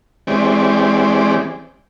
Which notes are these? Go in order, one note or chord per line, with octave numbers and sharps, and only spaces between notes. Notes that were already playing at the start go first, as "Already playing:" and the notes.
E3 G#3 C4 C#4 G4 D5